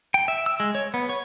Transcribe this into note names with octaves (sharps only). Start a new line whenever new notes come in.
G5
E5
E6
G#3
C#5
B3
C#5